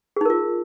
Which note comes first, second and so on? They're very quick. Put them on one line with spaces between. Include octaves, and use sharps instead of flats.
G#4 D#4 A#4 F4